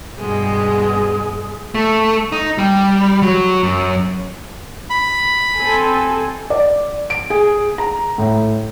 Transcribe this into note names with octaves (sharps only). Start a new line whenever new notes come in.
G2 B2 G#3 G#4
A3
D#4
G3
F#3
F#2
B5
C4 A4 G#5
D5
D7
G#4
A#5
A2